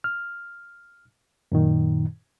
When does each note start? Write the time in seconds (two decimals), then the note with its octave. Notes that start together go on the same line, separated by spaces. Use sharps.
0.04 F6
1.52 F#2 A#2 D#3